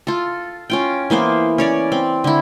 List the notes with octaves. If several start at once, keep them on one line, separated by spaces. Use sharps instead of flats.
F4 A4
C#4 F4 G5
E3 A#3 B3 C5
C#4 C#5 D5
C4
D3 E4